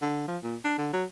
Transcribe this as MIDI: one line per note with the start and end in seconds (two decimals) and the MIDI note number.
0.02 0.27 50
0.28 0.38 53
0.43 0.56 46
0.65 0.78 62
0.78 0.93 50
0.93 1.05 54